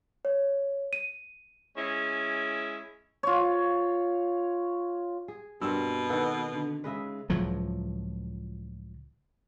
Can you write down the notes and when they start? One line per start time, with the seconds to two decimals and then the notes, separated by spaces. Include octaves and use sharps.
0.25 C#5
0.93 D#7
1.77 G#3 C#4 E4
3.23 F4 C#5
5.28 G#4
5.61 G2 B2 C4 A#4 E6
6.10 D#3 F#4 A4 B4 F#5
6.53 D3
6.84 C#3 G#3 B4 D#5 E5
7.30 C#2 A2 F3 F#3